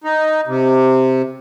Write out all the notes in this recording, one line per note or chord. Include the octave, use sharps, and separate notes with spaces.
D#4
C3